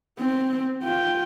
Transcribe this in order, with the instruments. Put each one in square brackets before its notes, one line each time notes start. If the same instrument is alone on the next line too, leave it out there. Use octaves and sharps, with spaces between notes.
[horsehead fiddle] C4
F4 G5